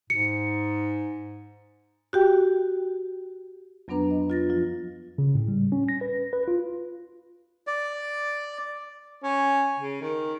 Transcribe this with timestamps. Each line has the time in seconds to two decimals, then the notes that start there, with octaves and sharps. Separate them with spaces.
0.10 G#2 C#7
2.13 F#4 G4 G5
3.88 F2 F#3 B3 D4 B4 A#5
4.11 D#5
4.30 F4 A6 A#6
4.49 F3 F4
5.18 C#3
5.35 A2
5.48 G3
5.72 C#4
5.89 A#6
6.01 B4
6.33 B4
6.48 F4
7.67 D5
9.23 C#4
9.79 C#3
10.01 D#3